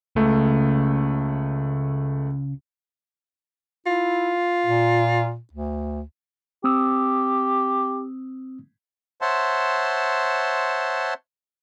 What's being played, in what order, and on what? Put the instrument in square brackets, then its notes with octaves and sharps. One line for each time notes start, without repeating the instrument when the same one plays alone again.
[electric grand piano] C#2 A3 [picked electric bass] C#3
[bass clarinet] E4 [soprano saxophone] F4
[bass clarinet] A#2
D2
[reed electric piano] C4 D#6 E6 [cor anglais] G4
[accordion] C5 C#5 E5 F#5 A5 C6